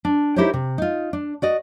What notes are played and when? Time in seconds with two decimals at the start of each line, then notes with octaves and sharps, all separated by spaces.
0.05 D4
0.36 D#4 E4 G4 A#4 C5 C#5
0.54 C3
0.78 D#4 F4
1.13 D4
1.42 F#4 D5 D#5